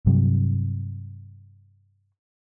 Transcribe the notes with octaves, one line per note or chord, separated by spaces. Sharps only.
G2 C3 F#3